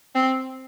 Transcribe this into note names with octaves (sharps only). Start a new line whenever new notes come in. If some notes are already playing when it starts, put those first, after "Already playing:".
C4